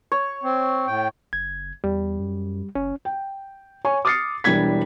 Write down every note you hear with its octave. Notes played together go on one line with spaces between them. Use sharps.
C#5
C4
A2 G5
F#1 G#6
E2 G3
F#2
F#1 C#4
G5
C#5 G#5 C#6
D6 D#6 F6 A6 C7 C#7
E1 E3 G3 D4 G#6 B6